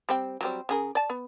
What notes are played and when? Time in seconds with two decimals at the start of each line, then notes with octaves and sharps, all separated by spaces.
0.09 G3 C4 G5
0.41 F#3 G3 C4
0.69 C#3 G#4 A#4
0.95 D5 A5
1.10 B3